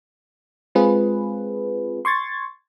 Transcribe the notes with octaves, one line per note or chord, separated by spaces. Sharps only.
G#3 C4 F4 G#4 B4
C6 C#6 G#6 A6